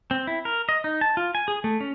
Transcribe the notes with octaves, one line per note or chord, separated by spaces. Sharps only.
C4
E4
A#4
D#5
D#4
A5
F4
G#5
G#4
A3
C#4